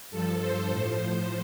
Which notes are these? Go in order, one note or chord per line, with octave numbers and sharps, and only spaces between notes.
G2 F3 A4
C5
A2 F3 C5